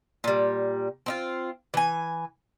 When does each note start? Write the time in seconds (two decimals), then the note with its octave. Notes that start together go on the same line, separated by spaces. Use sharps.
0.24 A#2 G3
1.06 C4 D#4 F4
1.74 E3 G#5